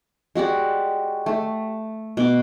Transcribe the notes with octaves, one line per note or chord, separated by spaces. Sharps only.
G#3 F#4 G4 D5
A3
B2 D6